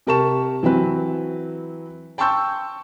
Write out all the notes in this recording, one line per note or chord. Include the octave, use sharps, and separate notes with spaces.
C3 G4 A#4 A5 C#6 E7
E3 F#3 C4 B4
G5 A5 C6 C#6 E6 G6